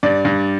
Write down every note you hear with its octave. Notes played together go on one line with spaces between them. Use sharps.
G2 D5
G2